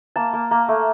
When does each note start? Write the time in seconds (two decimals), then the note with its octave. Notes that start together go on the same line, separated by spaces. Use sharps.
0.16 A#3 A5
0.33 A#3
0.51 A#3
0.68 A3